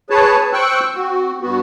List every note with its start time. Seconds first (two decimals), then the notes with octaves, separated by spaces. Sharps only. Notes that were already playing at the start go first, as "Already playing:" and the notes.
0.10 G#4 B4 C#5 A5
0.53 C5 G5 C#6 E6 F#6
0.95 C4 F#4
1.41 G2 B3 F#4